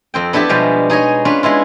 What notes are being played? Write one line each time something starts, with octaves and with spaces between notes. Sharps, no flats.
F2 C4 G5
B3 D4 E4 G4 A4
B2 F3 G3 G#3
D#4 G#4 C#5 D#5
C#4 D4 F4 B4
G#3 B3 E4 F4